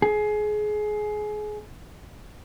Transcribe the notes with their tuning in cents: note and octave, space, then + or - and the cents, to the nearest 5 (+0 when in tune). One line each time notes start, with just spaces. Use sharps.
G#4 +25